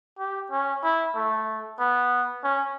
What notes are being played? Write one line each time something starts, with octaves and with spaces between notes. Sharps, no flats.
G4
C#4
E4
A3
B3
C#4